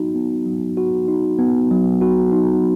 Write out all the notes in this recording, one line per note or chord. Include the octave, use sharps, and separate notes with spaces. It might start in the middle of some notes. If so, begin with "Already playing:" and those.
Already playing: F#3 B3 D#4 F#4
B3
F#3
F#4
D#4
B3
F#3
F#4
D#4